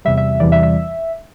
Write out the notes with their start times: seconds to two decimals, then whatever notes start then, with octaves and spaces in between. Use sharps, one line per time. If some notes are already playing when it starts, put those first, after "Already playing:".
0.05 E2 C3 G3 E5
0.17 E5
0.40 E2 C3 E3 G3 D5
0.52 E5
0.63 E5